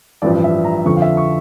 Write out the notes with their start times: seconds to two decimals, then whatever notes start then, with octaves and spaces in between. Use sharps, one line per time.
0.22 A1 G2 F3 D5
0.44 E5
0.64 A#5
0.85 F2 D3 F3 C#6
0.96 F5
1.02 E5
1.17 C#6